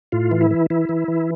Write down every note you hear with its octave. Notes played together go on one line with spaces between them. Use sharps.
A2 F4
E3
E4
E3
E3 E4
E3
E3